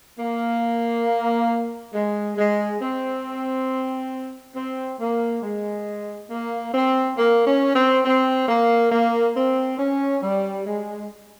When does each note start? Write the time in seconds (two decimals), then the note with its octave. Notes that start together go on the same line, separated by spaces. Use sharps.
0.20 A#3
1.95 G#3
2.38 G#3
2.82 C4
4.56 C4
5.00 A#3
5.43 G#3
6.31 A#3
6.74 C4
7.18 A#3
7.47 C#4
7.76 C4
8.05 C4
8.49 A#3
8.92 A#3
9.36 C4
9.79 C#4
10.23 G3
10.67 G#3